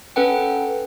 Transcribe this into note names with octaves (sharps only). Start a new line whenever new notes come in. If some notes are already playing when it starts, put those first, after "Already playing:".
C#4 A4 B4 F#5 G5